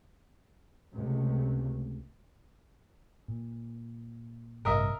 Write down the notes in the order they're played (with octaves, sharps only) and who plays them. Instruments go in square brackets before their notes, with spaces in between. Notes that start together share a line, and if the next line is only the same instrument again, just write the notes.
[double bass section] C#2 C3 A3
[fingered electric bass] A#2
[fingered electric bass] A1 G2 C3 [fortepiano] A#4 D#5 E5